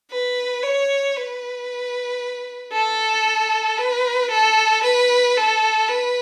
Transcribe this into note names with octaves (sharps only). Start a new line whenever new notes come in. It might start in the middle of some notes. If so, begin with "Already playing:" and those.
B4
C#5
B4
A4
B4
A4
B4
A4
B4